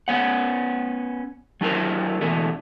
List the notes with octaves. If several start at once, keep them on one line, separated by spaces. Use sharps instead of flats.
B3 C#4 F#5
F#3 D4 E4 A#4 C5
B2 D3 E3 A3